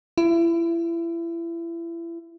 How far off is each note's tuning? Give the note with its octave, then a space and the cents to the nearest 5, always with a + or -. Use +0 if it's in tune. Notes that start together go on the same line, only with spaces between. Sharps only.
E4 +30